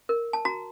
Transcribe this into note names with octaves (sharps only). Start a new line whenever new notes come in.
A#4
A5
F#4 A#5